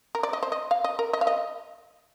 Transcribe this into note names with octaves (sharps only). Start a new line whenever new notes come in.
A#4
D5
D#5
C5
D#5
F5
D#5
A#4
D#5
F5
D#5